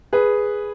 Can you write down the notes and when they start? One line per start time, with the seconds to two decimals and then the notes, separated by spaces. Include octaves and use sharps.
0.13 G#4 B4